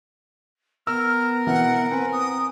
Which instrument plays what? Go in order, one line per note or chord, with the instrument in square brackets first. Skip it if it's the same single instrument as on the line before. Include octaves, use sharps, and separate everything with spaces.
[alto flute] B3 [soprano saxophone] A#4 [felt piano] E6 [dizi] F6
[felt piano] B2 E3 [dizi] F#5
[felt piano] C4 [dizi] B4 [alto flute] G#5
[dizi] D#6